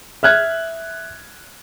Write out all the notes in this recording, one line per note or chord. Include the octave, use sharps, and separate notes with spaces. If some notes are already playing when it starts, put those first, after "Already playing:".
E5 F6 F#6 G#6